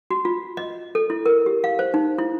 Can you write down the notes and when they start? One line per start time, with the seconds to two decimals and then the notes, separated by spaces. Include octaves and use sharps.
0.11 F#4
0.25 F4
0.57 D#5
0.95 A4
1.10 E4
1.26 A#4
1.46 G4
1.64 F5
1.79 C5
1.94 D#4
2.18 E4